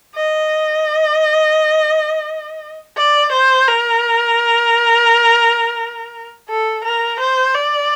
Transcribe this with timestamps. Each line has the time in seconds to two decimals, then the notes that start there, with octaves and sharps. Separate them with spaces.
0.15 D#5
2.97 D5
3.33 C5
3.68 A#4
6.49 A4
6.85 A#4
7.20 C5
7.55 D5